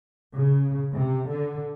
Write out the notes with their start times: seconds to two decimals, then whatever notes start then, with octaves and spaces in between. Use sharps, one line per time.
0.36 C#3
0.93 C3
1.29 D3